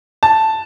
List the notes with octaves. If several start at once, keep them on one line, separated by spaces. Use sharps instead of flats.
A5